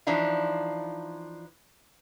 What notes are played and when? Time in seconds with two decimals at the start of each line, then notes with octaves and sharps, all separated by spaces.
0.07 E3 F3 D4 D#4 F4